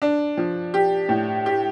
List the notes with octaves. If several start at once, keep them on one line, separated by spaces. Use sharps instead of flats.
D4
F3
G4
A2
G4